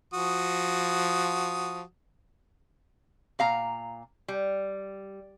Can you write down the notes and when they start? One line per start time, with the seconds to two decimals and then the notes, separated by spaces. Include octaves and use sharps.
0.14 F3 F#4 D#6
3.39 A#2 F5 A#5
4.28 G3